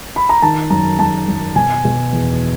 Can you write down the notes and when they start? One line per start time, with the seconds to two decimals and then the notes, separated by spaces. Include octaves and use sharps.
0.16 B5
0.29 A#5
0.42 D#3 A5
0.70 F#2 A#5
0.99 F#2 A5
1.28 F#2
1.56 B2 G#5
1.85 B2
2.13 E2